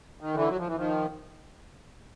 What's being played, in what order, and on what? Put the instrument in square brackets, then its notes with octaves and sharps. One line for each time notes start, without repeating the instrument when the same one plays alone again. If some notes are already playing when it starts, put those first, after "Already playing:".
[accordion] D#3
D3 E3
F#3
F3
E3
D#3 F3